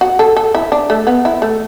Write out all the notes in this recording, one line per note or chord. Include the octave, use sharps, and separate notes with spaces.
F#4
A4
A4
E4
D4
A3
B3
E4
A3